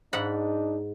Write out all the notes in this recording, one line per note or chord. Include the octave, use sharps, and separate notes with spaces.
G#2 D4 D#4 F#5 B5